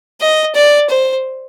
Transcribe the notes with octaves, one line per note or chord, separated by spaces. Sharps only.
D#5
D5
C5